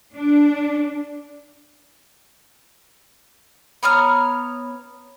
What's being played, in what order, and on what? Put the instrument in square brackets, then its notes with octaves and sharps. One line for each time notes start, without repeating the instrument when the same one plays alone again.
[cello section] D4
[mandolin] B3 C#5 A#5 F6